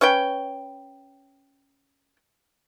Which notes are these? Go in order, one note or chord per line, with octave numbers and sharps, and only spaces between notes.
C#4 B4 C#5 G5